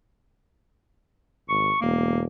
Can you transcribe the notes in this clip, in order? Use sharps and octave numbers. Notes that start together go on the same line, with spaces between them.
G#1 C#6
E1 A#3